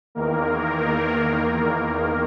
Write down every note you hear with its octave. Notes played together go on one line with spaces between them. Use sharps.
E2 D#3 A#3 A#4